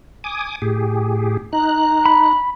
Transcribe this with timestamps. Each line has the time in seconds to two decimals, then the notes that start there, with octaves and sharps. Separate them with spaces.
0.24 G#5 D6 D#6
0.62 A2 G4 G#4
1.53 D#4 A#5 F#6
2.06 B5